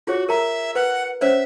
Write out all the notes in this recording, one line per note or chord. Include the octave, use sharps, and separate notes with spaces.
F4 F#4 G#4 C#5
A#4 E5 A#5
B4 F#5
C#4 C5 C#5 E5